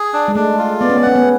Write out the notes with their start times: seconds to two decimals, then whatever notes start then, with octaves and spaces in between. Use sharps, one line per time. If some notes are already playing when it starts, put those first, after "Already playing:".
Already playing: G#4
0.13 D4
0.28 G#3
0.35 A3 D4
0.58 F4
0.81 B3 D5
0.90 C#4
0.97 B3
1.02 C#4 F#5
1.16 B3